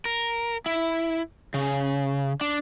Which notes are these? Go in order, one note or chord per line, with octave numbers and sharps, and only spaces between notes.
A#4
E4
C#3
D4